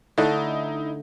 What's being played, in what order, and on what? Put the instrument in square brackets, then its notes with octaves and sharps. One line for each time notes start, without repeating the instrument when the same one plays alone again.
[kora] D3 A3 [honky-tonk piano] D#4 E4